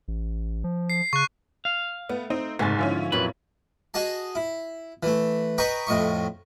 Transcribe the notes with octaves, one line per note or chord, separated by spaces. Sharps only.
A1
F3
C7
C#3 C#6 F#6
F5
A3 B3
C4 D#4
F#1 G#2 C3 A3 G#5 A6
D3 F3 C#4 E4 F4
F2 A#2 F#3 B4
F#4 G#4 D#5 A5
E4
E3 A3
B4 D#5 G5 A#5 C#6
F2 A2 D#5 C#6